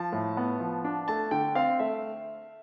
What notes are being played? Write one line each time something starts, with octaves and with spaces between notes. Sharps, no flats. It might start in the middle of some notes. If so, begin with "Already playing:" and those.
Already playing: F3 A5
A2
B3
F3
D4
A3 A5
D3 G5
C4 F5
A3 E5